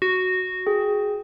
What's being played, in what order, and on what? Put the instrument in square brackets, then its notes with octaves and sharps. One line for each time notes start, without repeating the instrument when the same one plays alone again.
[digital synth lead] F#4
[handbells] G#4 G5